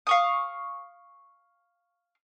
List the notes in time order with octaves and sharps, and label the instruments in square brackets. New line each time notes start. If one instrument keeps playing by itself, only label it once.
[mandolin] F5 C#6 D#6